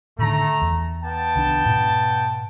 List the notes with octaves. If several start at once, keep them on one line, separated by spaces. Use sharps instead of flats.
A2 D3 D#3 A3 A#5
E2
B3 G5 A5
C2 D#3 D4
G#2 B2